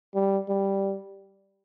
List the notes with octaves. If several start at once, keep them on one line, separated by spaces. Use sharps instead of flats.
G3
G3